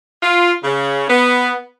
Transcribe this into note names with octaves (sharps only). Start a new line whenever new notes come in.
F4
C#3
B3